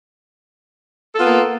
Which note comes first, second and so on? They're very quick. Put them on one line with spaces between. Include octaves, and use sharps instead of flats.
A4 F4 B3 A#3